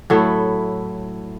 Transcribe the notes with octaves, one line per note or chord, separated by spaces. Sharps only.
A2 F#3 A3 E4